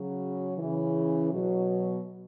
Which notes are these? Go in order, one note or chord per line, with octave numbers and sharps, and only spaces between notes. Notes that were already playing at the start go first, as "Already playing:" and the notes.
Already playing: C#3 F#3
C#3 E3
B2 F#3